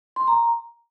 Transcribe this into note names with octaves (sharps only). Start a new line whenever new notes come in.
C6
A#5